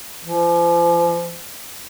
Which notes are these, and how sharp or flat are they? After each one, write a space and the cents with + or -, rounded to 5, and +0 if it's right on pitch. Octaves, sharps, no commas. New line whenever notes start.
F3 -35